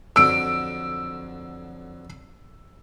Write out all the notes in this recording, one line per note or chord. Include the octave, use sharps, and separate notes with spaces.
F2 D3 F#3 E6 D7